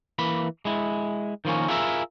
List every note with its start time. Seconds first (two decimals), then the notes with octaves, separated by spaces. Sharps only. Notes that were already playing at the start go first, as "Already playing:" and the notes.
0.19 E3 A#3 B5
0.65 G#3 E4
1.45 D#3 F3 A#3 C#4
1.68 E4 F4 G#4 A#4 D#5 E5